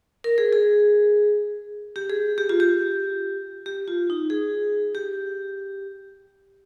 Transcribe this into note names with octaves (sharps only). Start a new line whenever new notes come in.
A#4
G#4
G#4
G4
G#4
G4
F4
G4
G4
F4
D#4
G#4
G4